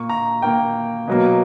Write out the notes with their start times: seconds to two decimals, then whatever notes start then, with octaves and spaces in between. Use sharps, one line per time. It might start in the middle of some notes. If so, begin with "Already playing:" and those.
Already playing: A#2 A#3 C#6
0.09 A#5
0.42 A#2 A#3 G5
1.08 B2 F#3 A#3